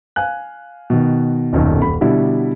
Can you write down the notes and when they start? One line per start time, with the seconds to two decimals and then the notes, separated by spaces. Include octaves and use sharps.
0.16 F5 G#5 F#6
0.90 B2 D#3
1.53 D#1 B1 F#2 D#3
1.81 D#1 B5
2.01 B2 D3 G3 E4